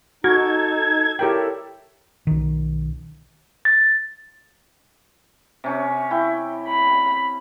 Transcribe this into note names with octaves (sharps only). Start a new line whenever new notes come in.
D#4 F#4 A4 G#6
E4 G4 A4 A#4 C#5 G5
B1 D#3
A6
C3 C#4 C#6
E4 G5
B5